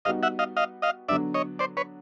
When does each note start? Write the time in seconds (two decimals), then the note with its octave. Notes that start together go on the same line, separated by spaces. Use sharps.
0.05 G3 B3 D#4 F#4 D#5 F5
0.23 E5 F#5
0.39 D#5 F5
0.57 D#5 F5
0.82 D#5 F5
1.08 D3 F#3 B3 D4 D5 E5
1.34 C#5 D#5
1.59 C5 D5
1.77 B4 C#5